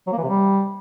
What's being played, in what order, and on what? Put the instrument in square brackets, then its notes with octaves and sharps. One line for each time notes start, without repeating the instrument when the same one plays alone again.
[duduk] F#3
A#3
E3
C3
G3